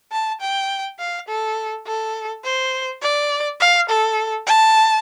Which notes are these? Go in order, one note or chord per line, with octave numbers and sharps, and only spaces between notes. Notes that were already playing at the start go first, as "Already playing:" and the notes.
A5
G5
F5
A4
A4
C5
D5
F5
A4
A5